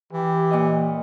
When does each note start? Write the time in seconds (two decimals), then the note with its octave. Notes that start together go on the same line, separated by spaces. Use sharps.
0.13 E3 G4
0.51 A#2 D#5